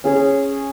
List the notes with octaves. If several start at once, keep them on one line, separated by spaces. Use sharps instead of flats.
C#4 G#4 C#5